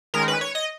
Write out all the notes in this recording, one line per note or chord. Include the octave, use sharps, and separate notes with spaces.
D#3 G#3 C#4 A#4
B4
C#5
D#5